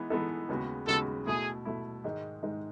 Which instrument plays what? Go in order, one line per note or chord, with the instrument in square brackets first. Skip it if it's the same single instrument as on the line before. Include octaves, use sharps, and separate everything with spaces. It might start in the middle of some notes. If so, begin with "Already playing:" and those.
Already playing: [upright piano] E3 G#3 B3 D#4
E3 G#3 B3 D#4 A4
D#2 C#3 G#3 B3 F#4
[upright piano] D#2 C#3 G#3 B3 F#4 [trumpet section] A4
[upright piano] B2 A3 E4 [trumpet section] G#4
[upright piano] B2 A3 E4
G#2 D#3 G#3 D#4
G#2 D#3 G#3 D#4